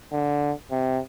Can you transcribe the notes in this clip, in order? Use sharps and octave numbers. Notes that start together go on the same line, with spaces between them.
D3
C3